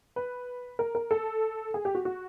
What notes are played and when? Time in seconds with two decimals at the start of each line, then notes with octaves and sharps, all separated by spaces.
0.16 B4
0.79 A#4
0.95 A#4
1.11 A4
1.74 G#4
1.85 G4
1.95 F#4
2.05 F#4